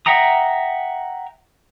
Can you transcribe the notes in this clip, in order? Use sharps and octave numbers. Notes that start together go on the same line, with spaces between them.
E5 F#5 G5 A#5 D#6